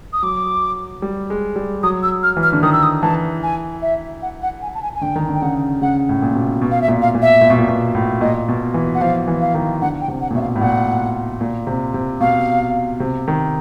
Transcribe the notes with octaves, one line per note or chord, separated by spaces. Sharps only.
D#6
F#3 D6
G3
G#3
G3
F#3 D#6
E6
F6
E3
F6
D3
D#3 D#6
E6
D#6
E3 A5
G#5
E5
F#5
F#5
G#5
A5
G#5
G#5
D3 G5
D#3
D3
G5
C#3 F#5
C#3 F#5
A2
A#2
B2
B2
F5
E5
A#2
F5
A#2
E5
A#2
B2
A#2
B2
A2
A#2 D#5
B2
E3
F#5
F3 F5
E3
F5
D#3
D3 F#5
G5
C3
F#5
A#2
B2 E5
F5
A2
A#2 F#5
A#2
C3
C3
B2 F5
C3
D#3